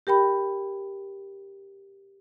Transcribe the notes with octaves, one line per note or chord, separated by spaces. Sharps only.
G4 A#4 G5 B5